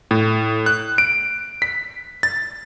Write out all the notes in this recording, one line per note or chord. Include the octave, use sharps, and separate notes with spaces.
A2
F#6
D7
B6
A6